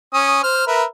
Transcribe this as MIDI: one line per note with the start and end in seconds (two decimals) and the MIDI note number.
0.14 0.42 61
0.14 0.42 87
0.43 0.67 72
0.43 0.67 89
0.67 0.84 70
0.67 0.84 71
0.67 0.84 76